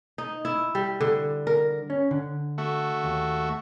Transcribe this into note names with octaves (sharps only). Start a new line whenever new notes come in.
D#4
E4
G3
D3
A#4
C#4
D3
A3 F#4
D#2